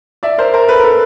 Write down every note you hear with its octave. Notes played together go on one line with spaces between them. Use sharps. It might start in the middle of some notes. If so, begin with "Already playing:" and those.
D5 E5
A#4 C5
A#4 C5
A4 B4
A#4
A4 B4